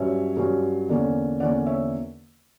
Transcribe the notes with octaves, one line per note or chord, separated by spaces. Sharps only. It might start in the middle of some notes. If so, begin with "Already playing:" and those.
Already playing: G2 F#3 C#4 C#5 E5
G2 F#3 C#4
E2 D3 A#3 C#4
E2 D3 A#3 C#4 D5 F#5
C#5 E5